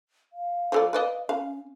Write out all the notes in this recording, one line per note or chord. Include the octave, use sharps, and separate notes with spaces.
F5
F3 A4 D5
B4 D5 D#5
C#4 F5